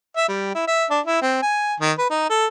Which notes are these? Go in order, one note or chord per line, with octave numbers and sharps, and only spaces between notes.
E5
G3
E4
E5
D4
E4
C4
G#5
D#3
B4
D#4
A4